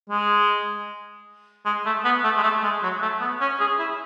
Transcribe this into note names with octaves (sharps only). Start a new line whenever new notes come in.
G#3
G#3
A3
B3
A3
G#3
A3
G#3
F#3
A3
B3
C#4
G#4
E4